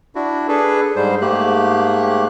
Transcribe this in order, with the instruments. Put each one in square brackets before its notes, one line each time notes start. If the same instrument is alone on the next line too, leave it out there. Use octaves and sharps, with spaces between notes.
[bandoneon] D4 E4 F#4
D4 G#4 A4 B4
G#2 G3 C5
G#2 A3 A#3 G4 F#6